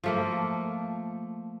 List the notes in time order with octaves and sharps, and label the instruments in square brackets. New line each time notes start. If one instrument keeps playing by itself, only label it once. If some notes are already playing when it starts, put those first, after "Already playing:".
[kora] F3 A3 A#3